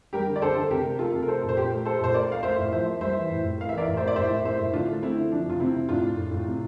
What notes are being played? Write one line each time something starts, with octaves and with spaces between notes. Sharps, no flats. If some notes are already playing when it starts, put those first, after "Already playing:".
G3 G4 A#4
D3
D5
D3 A4 C5
D3
C3 G4 A#4
A#3
A#3 F4 A4
C3
A#4
A3 A4 C5
A#2
C5
A#2 G4 A#4
A3
A3 A4 C5
A#2 C5
A3 A#4 D5
A3 F5
A#3 C5 E5
A2
F3 C5 E5
A#3
G3 C5 E5
E3
A2
A2
A#3 F5
E5
E3
A#4 D5
A2
A#3 C5 E5
D5
A2 C5 E5
A2
A#3 C5 E5
A2
D3 D4 F4
A3
A3 C4 E4
D3
F3 D4
C3 F4
C3 C4 E4
C3
A2 D4 F4
A2
A2
A2
C3